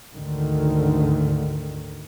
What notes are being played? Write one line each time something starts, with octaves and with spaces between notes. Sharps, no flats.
D2 G#2 D3 D#3